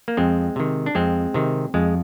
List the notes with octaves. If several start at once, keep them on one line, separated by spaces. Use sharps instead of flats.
A#3
F2 G#3 C4
C3 D#3
D4
F2 G#3 C4
C3 D#3
F2 G#3